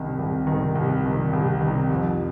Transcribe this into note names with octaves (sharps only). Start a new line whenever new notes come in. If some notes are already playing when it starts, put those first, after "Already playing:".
Already playing: C2 C3 D#3
C2
C3 D#3
C2
C3 D#3
C2
C3 D#3
F2